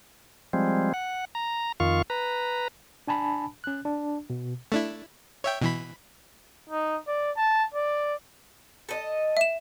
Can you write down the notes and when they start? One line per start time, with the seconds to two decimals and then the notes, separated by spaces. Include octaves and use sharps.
0.53 F3 G3 G#3 C4
0.94 F#5
1.35 A#5
1.80 F2 D#3 F4 F5 C#6
2.10 B4 A#5
3.08 D4 G#5 A5 B5
3.64 C#4 F#6
3.85 D4
4.30 B2
4.72 A3 D4 E4
5.44 C#5 E5 G5
5.62 B2 E3 B5
6.69 D#4
7.07 D5
7.36 A5
7.74 D5
8.89 A4 D#5
9.37 E5 E7